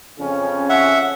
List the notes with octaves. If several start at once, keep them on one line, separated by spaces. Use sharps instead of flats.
F2 C#3 C#4
E5 F#5